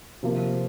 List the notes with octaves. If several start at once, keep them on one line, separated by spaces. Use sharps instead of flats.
C3 F3 A#3